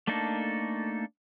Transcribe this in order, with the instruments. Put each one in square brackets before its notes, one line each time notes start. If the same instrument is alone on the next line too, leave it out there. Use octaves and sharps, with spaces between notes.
[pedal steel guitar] A3 A#3 D4 D#4 A4